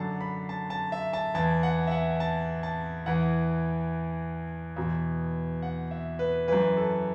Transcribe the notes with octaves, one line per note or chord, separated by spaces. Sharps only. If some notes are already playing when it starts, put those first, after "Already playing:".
Already playing: F#2 D3 F#5 A5
B5
A5
A5
E5
A5
E2 E3 A5
F#5
E5
F#5
A5
A5
E2 E3 F#5
E2 B2
F#5
E5
B4
F#2 E3 B4
A4